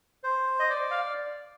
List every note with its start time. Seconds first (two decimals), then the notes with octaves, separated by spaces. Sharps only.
0.24 C5
0.59 D#5
0.70 D5
0.91 F5